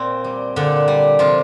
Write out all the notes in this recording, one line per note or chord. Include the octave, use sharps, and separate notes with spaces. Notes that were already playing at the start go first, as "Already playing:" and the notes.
Already playing: A#2 C4
G3
A#2 D3 D4
G3
C3 F3 F4